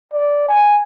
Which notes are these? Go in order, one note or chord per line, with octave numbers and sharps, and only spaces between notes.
D5
G#5